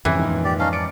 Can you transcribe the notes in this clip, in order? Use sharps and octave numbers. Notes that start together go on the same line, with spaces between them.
F2 G#2 C3 E3 F3 C#4
A#2 D#3
G4 D5
C#4 D#4 F5 A5
D5 D6 C#7 D7